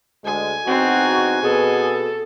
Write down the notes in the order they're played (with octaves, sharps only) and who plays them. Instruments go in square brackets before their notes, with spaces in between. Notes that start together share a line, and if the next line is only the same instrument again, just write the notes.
[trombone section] D2 G#3 [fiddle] G#5
[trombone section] E2 D#4 F#4 [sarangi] C4
[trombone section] B2 [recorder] G#4 [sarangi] A4